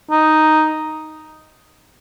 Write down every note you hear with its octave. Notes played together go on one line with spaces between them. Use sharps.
D#4